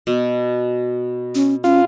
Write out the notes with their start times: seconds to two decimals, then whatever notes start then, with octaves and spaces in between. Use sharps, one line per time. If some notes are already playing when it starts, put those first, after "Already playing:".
0.07 B2
1.35 C#4
1.64 C#4 F4